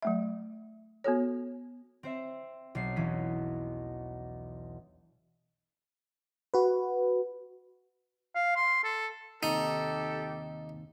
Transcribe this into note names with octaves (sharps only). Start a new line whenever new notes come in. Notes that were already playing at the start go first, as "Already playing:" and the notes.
F#3 A3 E5
B3 F#4 A4 C#5
C4 C5 E5
B1 C7
E1 E3 C#4 B6
F#4 B4
F5
C6
A4
D#2 C3 D#4 G4 A4